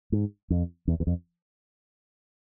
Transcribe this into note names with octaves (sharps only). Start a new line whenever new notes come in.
G#2
F2
E2
E2
F2